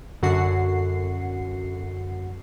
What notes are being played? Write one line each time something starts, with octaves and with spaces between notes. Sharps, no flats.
F#2 D3 F#4 F#5 C7